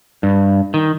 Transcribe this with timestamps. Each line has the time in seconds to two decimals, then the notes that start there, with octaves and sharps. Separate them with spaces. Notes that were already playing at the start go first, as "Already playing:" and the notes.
0.23 G2
0.74 D#3